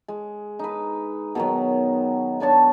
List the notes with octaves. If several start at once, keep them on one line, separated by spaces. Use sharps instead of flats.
G#3
D#4 B4
B2 D#3 F#3
B3 D4 C#5 A5